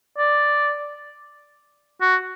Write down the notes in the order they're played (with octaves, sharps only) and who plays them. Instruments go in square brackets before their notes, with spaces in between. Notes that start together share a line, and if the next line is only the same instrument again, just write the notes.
[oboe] D5
F#4